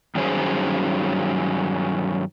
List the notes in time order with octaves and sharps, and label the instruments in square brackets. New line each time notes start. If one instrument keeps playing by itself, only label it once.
[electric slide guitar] G2 D#3 F#3 C#4 G#4 C5